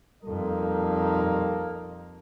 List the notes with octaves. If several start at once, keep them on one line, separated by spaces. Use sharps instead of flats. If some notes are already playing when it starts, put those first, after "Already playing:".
F2 G3 A#3 D#4 A4